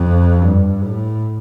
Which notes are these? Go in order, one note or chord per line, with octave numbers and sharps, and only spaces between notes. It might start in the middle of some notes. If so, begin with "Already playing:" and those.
Already playing: F2
G2
A2